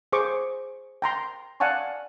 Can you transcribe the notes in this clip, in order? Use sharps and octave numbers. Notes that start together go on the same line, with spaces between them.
G#4 C5 C#6 D6
G5 A#5 C6
D5 F5 F#5 G#5 A5 C#6